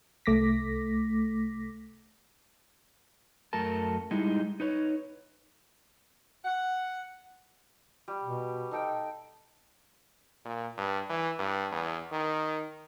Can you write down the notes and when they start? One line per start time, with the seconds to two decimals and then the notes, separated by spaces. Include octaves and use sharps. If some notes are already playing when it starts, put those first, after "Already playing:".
0.26 C2 A3 D6 A#6 B6
3.53 F#2 F#3 A3 A#4 A5
4.11 G3 G#3 D#4 E4
4.60 D#4 B4 C#5
6.44 F#5
8.08 G3
8.23 B2
8.71 D#4 A4 G5
10.45 A#2
10.78 G2
11.09 E3
11.39 G2
11.72 E2
12.12 D#3